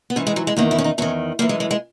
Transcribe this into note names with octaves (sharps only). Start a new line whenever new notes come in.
B3
G#2 E3 C#4
G#3
F#3
G#3
E2 D#3 A#3
E4
C#4
D#4
E2 D#3 C#4
F#2 E3 A#3
G#3
G#3
G#3